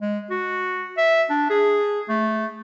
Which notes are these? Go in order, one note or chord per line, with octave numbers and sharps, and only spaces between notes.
G#3
F#4
E5
D4
G#4
A3